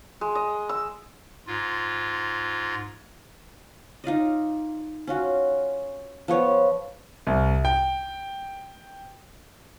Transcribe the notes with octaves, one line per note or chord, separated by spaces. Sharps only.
G#3
D#5
E6
G#2 F4
D#4 F4 D5 D#5
C#4 F4 F#4
F3 B3 C#5
C2
G5